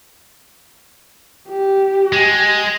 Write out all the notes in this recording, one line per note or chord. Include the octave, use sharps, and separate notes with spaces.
G4
G#3